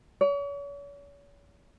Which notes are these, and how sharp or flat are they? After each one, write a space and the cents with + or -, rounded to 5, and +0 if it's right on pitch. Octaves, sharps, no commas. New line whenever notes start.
C#5 +40